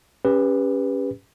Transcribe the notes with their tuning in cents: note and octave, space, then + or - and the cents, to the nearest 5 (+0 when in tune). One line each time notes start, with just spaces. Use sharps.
C#4 +0 G4 +35 B4 +0